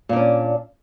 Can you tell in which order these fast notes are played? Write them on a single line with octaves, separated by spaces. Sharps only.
A#2 D4 C#4